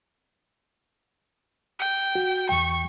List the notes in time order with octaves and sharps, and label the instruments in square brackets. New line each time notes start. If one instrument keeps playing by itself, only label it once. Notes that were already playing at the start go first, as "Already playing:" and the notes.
[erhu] G5
[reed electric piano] F#4
[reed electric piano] E2 G5 [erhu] C#6